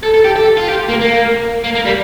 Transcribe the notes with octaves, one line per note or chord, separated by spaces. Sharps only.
A4
A4
G4
A4
F4
G4
A#3
A#3
A#3
A#3
G3